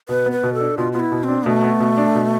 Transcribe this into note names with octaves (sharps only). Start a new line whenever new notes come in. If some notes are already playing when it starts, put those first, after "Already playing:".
B2 B4
B3
B4
B2
A4
D4
B2 F4
B3 F4
E4
B2
C4 D4
B2 A3
B3
B2
D4
B2